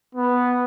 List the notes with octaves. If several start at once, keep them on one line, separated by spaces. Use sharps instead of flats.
B3